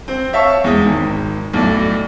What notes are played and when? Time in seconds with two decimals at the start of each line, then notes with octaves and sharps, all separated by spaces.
0.08 C4 C5
0.33 C#5 E5 F5 A5 C#6
0.64 E2 G#3 D#6
0.84 G#1 D#3
1.53 B1 A2 A3 D5